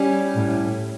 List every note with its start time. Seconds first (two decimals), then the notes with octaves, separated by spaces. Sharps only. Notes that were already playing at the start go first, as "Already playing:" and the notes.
Already playing: G3 C#4 E4 G4
0.35 A2